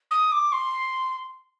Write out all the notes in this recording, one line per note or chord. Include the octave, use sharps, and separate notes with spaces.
D#6
D6
C6